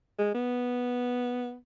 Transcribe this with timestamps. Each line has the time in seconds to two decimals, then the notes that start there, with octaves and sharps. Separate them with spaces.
0.19 G#3
0.34 B3